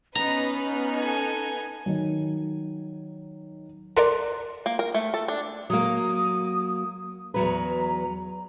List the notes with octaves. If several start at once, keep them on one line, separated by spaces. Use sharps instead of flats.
B3 C#4 D#4 B4 A#5
A4 G#5
D#3 F#3
A4 A#4 D5 C6 F#6
A#3
A#4
A3
A4
D4
F#3 A#3 D#6
E2 F#3 B4 A#5